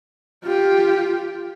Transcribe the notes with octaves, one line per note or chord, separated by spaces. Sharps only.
F4 G4